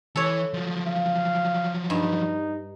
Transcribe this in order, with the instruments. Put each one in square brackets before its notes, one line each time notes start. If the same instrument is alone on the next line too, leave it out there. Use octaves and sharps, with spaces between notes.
[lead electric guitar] E3 [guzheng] A4 C#5
[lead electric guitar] F3 F#3
[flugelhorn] F5
[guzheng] G2 [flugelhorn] D#4